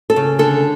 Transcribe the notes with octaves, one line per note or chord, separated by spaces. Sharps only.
A4
C#3
D3 A4